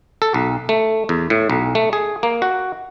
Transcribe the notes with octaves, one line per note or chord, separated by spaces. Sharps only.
A4
B1
A3
E2
A2
B1
A3
G#4
A#3
F#4